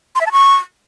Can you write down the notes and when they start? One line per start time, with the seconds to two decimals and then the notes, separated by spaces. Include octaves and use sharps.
0.15 C6
0.21 E5
0.26 A5
0.32 C#6